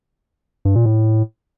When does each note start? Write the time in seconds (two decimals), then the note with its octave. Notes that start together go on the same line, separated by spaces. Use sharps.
0.65 G2
0.75 A#2
0.86 A2